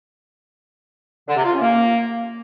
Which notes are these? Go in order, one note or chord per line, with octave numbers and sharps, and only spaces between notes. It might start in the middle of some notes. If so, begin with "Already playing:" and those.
D3
C3
F4
C#4
A#3